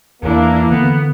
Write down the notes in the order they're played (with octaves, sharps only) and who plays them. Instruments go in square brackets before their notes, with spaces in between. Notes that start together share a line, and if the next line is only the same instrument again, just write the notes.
[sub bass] E2 [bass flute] E3 [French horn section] A#3 [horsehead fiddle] D4 E4
[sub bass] D3 [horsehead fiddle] B3